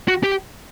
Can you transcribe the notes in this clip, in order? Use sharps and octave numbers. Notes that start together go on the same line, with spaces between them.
F#4
G4